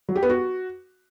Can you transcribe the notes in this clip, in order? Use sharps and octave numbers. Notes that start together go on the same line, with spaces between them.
F#3
G4
B3
F#4